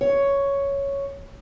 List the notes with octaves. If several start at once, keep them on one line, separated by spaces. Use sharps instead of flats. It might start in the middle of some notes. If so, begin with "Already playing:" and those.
C#5